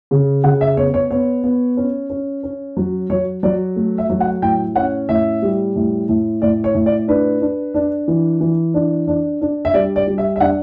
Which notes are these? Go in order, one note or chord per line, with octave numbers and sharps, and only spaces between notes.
C#3
C#3 F#5
E5
B3 C#5
C#5
B3 C#5
B3
C#4
C#4
C#4
F#3
F#3 C#5
F#3 D5
A3
E5
F#3
F#5
A2 G5
C#4 F#5
A2 E5
G3
A2
A2
A2 D5
C#5
A2
D5
D4 B4
D4
D4
E3
E3
D4
D4
D4
E5
G3 D5
D5
G3
E5
E5
D4 F#5